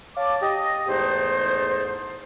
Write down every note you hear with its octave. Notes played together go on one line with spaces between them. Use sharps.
C#5 F5 A5 D6
G4 D#5
E2 G#2 A3 D#4 C5